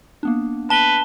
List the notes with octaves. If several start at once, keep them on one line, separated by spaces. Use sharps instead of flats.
A#3 B3 D4
B4 A5 G7